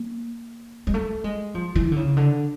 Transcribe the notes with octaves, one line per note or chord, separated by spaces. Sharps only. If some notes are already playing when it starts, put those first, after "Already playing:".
Already playing: A#3
G#3
A3
G#3
F3
E3
D3
C#3
D3